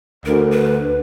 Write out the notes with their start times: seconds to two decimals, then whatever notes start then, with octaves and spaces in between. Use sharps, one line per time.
0.26 D2 A#4
0.51 B4